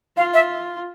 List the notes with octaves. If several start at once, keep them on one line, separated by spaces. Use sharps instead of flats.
F4 F5
E5